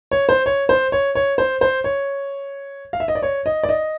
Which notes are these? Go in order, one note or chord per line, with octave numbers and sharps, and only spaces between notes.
C#5
C5
C#5
C5
C#5
C#5
C5
C5
C#5
F5
E5
D#5
D5
C#5
D#5
D5
D#5